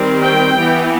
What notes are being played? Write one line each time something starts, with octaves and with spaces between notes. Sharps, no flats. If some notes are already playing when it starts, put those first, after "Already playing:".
Already playing: D#3 G3 C4
G5
E3 B3